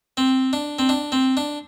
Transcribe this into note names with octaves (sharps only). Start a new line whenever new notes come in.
C4
D4
C4
D4
C4
D4